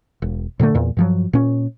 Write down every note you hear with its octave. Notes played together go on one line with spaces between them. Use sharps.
E1
A#2 D3 G#3 A3
E2 A#2
G2 F3 F#3
A#2 C#4